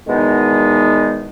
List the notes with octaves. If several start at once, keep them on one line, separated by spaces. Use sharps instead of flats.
E2 B2 D#3 G#3 B3 D#4